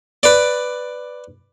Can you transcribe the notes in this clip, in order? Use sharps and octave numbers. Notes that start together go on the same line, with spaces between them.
B4 D5